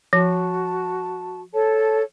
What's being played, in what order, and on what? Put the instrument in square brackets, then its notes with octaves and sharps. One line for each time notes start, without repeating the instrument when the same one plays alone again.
[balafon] F3 [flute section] F#4 A5
[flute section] A4 C#5 A5